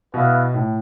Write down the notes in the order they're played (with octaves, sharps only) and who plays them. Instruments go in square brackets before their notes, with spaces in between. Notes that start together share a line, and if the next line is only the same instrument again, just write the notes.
[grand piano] B2 [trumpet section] B3 E4 B4 F5
[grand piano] A2